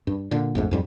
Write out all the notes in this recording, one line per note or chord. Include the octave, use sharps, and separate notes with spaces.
G2
A#2 D3
A#1 F2 G#2 A3
F2 G#2 G3